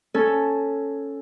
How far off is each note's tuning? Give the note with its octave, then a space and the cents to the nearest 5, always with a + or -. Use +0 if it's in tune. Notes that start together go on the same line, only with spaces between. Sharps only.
C#4 +0 A4 +0